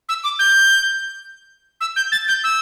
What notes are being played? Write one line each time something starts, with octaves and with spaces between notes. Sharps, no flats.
E6
D6
G6
E6
G6
A6
G6
E6